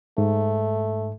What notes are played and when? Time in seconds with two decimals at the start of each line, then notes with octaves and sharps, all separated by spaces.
0.18 G#2 A3